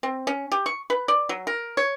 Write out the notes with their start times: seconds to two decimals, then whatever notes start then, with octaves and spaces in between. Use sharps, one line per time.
0.03 C4
0.27 C#4
0.52 G4
0.66 C#6
0.90 B4
1.08 D5
1.29 F#3
1.47 A#4
1.77 C#5